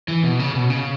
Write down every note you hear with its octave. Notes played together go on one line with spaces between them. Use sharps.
E3
B2
C#3
B2
C#3